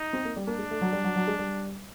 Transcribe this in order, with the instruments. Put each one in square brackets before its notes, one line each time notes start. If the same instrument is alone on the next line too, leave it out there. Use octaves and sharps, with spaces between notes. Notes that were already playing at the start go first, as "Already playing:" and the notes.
Already playing: [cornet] D#4
[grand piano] C4
A#3
G3
[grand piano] A#3 [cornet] D4
[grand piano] G#3
A3
F#3
G3
F#3
F#3
G#3
G3